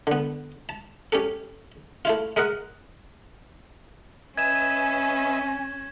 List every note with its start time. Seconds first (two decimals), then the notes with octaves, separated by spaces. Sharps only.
0.07 D3 B3
0.69 A5
1.12 C#4 G4 A4
2.05 A3 E4 F4
2.36 G#3 A#4 D#5 F#5
4.38 C#4 B4 D#5 E5 G#5 G#6 E7